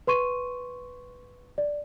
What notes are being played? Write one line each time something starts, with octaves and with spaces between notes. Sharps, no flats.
B4 C6 C#6 D#7
D5